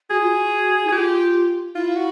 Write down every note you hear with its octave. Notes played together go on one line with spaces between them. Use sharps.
F#4 G#4
F4
F#4
E4
G#4
F4 G4
E4 F4
F#4